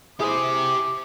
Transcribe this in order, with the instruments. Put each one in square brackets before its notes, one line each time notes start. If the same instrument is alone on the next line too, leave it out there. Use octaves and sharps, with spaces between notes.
[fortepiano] E4 G#4 D#6 [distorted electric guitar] G4 C5 [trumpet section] D6